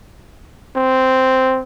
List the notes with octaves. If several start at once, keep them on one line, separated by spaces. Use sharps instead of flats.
C4